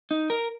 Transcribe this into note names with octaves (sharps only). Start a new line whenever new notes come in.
D#4
A#4